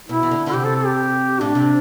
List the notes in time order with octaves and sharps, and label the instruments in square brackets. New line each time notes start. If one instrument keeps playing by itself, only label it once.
[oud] B2 [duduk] E4
[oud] E3
D3
D3
[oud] C3 [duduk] G4
[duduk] A4
A4
G4
[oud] A2 [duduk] D4
[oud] C3